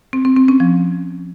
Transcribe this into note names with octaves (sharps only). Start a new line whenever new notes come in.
C4
C4
C4
C#4
F3